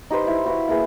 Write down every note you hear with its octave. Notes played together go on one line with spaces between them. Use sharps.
D#4 G4 B4 C5
E4 C5
F#4 B4 F5
A#3 E4 G#4 B4